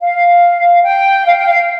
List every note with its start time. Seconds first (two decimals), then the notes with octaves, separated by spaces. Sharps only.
0.01 F5
0.83 G5
1.25 F5
1.37 G5
1.48 F5